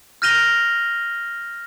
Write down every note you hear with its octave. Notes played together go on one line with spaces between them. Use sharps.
F6 G6 A#6 D#7 F7 G7